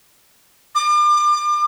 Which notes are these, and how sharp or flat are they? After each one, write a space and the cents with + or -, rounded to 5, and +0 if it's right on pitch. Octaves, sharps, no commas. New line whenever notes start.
D6 +35